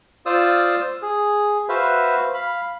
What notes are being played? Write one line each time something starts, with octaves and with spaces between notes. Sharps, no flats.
F4 C5 D5 F5 D#6 E6
G#4
F#4 B4 C5 E5 F5
F5 B5